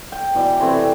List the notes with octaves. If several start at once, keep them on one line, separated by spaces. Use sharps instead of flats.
G5
B2 E3 D5
C3 E3 A3 C4